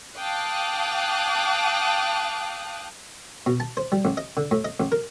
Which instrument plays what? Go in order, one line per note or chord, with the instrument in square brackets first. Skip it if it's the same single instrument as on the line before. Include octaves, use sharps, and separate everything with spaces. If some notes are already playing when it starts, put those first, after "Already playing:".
[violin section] F5 G5 A5 D6 D#6 F#6
[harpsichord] B2
A5
C5
G3
A1
D#5
D3
A2
D#5
A1
A#4